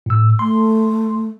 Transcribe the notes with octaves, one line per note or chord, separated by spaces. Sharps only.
A2 E6
A3 C6